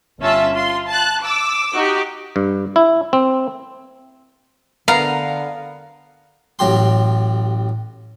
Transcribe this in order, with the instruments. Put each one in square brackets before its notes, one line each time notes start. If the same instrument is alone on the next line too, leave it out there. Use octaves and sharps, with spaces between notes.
[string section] G1 C#4 F4 E5 A5 E6
F4 C6
A5 F#6
D6 E6
D#4 F#4 G4
[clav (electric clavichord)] G2
E4
C4
[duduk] D3 [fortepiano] B3 A#4 B4 [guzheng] F5 [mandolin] A#5
[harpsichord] A1 F#3 G4 C6